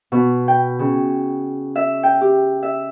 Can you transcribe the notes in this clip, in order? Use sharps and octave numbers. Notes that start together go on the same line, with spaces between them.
B2
G5
C#3
E5
G5
G4
E5